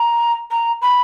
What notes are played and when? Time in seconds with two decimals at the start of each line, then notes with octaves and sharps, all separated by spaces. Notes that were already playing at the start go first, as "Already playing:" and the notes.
Already playing: A#5
0.50 A#5
0.81 B5